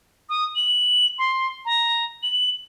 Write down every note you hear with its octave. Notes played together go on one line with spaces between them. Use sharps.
D#6
F#7
C6
A#5
F#7